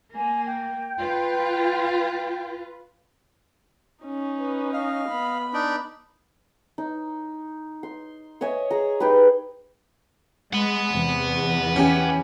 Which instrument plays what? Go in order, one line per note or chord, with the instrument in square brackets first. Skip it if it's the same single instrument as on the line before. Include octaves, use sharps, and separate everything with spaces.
[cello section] A#3 [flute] G#5
[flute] G5
[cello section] F4 B4
[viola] C#4 D#4
[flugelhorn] B4
[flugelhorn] D#5 [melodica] F5
[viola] B3 B5
[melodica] D4 D#4
[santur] D#4
C6
C#5 D#5 E5 G#5
G#4 A#5
D#4 G4 G#4 B4
[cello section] G#3 [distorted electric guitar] F#5 B5
[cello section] E2 [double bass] C3
[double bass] E3 [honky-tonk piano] C#4 G4 G#5